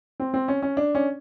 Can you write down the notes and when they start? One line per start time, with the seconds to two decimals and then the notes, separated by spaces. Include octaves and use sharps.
0.20 C4
0.34 C4
0.48 C#4
0.62 C#4
0.77 D4
0.95 C#4